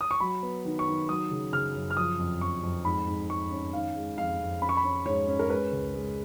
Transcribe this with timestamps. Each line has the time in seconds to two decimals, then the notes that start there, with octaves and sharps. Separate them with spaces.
0.01 D#6
0.11 C#6
0.20 F#3 B5
0.42 B3
0.65 D#3
0.79 C#6
0.87 D#3
1.09 F#3 D#6
1.31 C#3
1.53 C#3 F6
1.75 F#2
1.90 F6
1.97 F3 D#6
2.19 F2
2.41 F2 C#6
2.63 F2
2.85 G#2 B5
3.07 G#2
3.29 G#2 C#6
3.51 C#4
3.73 D#3 F5
3.96 G#3
4.18 F2 F5
4.40 F2
4.62 C#4 B5
4.69 C#6
4.77 B5
4.84 C#4
5.06 G#2 C#5
5.28 C#4
5.39 A#4
5.50 G#3 B4
5.72 C#2
5.94 G#3